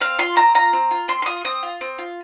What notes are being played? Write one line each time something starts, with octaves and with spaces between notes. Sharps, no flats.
C4 F5
F4 C6
C4 A#5
F4 A#5
C4
F4
C4 C6
C6
F4 D#6
C4 D#6
F4
C4
F4